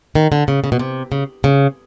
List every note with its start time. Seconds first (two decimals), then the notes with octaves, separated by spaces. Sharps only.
0.15 D#3
0.32 D3
0.48 C#3
0.64 C#3
0.72 B2
0.79 C3
1.12 C#3
1.44 C#3